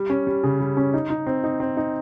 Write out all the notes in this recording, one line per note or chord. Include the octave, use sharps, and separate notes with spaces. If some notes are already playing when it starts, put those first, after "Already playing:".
Already playing: G3
C#4
G3
C#3
G3
C#4
D#4
D#4
C4
D#4
C4
D#4